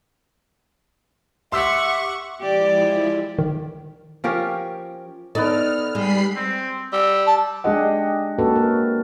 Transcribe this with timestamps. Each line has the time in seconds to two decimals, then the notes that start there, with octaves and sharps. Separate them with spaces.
1.52 G4 E5 F#5 C6 C#6 E6 B6
2.41 F3 G#3 E4 G4 D5
3.39 D#3
4.24 F3 C#4 G4 A#4
5.35 B3 D#4 A4 D5 D#5 F6
5.95 G3 G#3 B5 C7
6.36 C4
6.93 G3 E6
7.26 A5
7.64 G#3 D4 G4 G#4 D#5 F#5
8.38 A#3 C#4 F#4 A4 B4
8.56 A#4